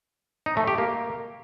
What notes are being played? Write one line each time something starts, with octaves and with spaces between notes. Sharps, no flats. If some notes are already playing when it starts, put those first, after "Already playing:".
D#4
A3
G4
A#3